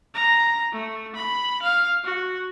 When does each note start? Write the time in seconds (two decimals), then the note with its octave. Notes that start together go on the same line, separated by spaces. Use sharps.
0.14 A#5
0.72 A3
1.16 B5
1.62 F5
2.04 F#4